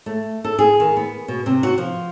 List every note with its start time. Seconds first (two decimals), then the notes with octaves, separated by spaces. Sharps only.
0.06 A3
0.44 A4
0.59 G#4
0.80 D#3
0.97 B3
1.28 B2
1.46 C3
1.63 F#4
1.78 F3